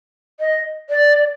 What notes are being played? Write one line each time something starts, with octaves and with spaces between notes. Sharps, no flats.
D#5
D5